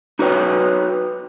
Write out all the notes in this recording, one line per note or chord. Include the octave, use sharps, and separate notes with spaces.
D#4 F#4 B4 C#5 G5